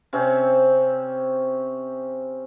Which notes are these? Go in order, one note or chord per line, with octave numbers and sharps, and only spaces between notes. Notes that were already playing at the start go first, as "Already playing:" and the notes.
C3 C4 C#4